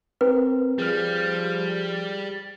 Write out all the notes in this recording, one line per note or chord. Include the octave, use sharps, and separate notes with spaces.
C4 A#4 B4
F3 G3 G#4 F6